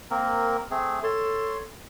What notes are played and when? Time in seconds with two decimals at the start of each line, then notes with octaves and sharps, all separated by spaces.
0.11 A#3 C4 A#4
0.71 A3 C4 G#4
1.03 A4 C#5 C6